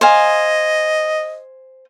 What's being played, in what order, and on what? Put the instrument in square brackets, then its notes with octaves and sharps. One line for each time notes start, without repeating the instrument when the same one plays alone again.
[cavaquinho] C5 F5 G#5 [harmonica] D#5